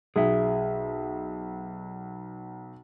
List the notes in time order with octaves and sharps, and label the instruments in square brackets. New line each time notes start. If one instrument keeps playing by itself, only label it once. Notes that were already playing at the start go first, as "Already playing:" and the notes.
[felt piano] B1 [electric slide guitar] G#4 E5